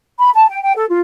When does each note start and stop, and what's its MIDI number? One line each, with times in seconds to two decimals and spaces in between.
0.18 0.30 83
0.34 0.48 81
0.49 0.62 79
0.63 0.73 79
0.76 0.85 69
0.90 1.01 65